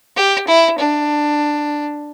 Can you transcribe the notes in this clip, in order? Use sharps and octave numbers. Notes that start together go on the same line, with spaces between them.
G4
E4
D4